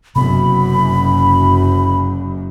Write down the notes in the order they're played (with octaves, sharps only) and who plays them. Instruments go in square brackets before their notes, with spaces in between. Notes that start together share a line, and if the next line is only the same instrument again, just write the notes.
[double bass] F#1 F#2 [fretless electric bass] C3 B3 [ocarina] B5